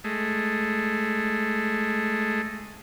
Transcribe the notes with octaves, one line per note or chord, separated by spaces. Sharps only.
G#3 A3